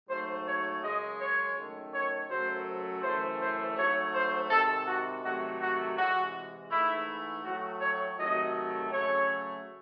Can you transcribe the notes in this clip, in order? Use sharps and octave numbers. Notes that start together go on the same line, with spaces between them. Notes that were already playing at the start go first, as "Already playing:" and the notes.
G#2 F#3 A3 C5
C#5
F#2 C#3 G#3 D#5
C#5
F#2 D#3 A3
C#5
F#2 C#3 F#3 A3 C5
F#2 C#3 E3 A3 C5
C5
G#2 F#3 A3 C#5
C5
C3 D#3 G#3 A4
F#4
C3 D#3 F#3 A3 F#4
F#4
C3 E3 G#3 F#4
G#2 E3 A3 E4
A2 F#3 A3 F#4
C#5
C3 D#3 F#3 A3 D#5
C#3 F#3 A3 C#5